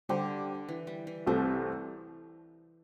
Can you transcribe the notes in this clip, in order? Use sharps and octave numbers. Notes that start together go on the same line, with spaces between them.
D3 G3 D4 G4 C5
E3
G3
E3
C2 C3 G3 A3 C4